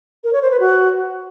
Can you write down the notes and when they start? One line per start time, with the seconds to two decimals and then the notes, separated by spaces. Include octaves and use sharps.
0.24 A#4
0.33 C#5
0.42 C5
0.51 B4
0.60 F#4